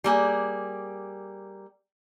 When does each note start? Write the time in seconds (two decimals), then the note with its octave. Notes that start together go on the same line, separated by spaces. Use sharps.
0.04 G3 A#3 G#4